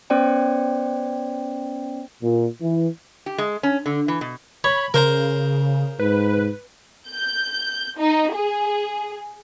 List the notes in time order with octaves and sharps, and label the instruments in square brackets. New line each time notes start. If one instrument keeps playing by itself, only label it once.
[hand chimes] B3 C#4 C5 D5 G5
[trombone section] A#2
E3
[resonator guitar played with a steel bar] G4
G#3
C#4
D3
E3
B2
[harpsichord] C#5 [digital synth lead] B5
[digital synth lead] C#3 [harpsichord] A#4 C5 A#5
[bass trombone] G#2 [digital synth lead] B4
[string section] G6
D#4
G#4